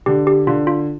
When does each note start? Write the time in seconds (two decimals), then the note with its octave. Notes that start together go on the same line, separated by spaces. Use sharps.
0.06 D3 G4
0.27 G4
0.47 D3 F4
0.67 F4